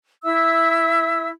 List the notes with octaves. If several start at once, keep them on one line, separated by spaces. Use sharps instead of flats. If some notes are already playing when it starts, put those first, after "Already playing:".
E4 E5 E6